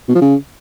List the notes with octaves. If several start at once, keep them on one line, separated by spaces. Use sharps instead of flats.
B2
F3
C#3